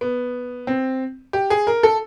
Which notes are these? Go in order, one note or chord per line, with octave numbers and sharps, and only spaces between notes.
B3
C4
G4
G#4
A#4
A4